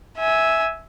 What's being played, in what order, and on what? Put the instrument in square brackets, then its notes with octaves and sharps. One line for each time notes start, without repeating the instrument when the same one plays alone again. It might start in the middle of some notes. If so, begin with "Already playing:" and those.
[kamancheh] E5 G#5